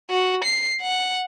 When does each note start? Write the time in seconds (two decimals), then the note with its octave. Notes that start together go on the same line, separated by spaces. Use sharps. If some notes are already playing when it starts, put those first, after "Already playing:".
0.10 F#4
0.44 C7
0.81 F#5